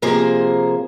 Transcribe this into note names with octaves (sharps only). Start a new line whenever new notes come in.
C3 F3 A#3 G#4 A#4 C5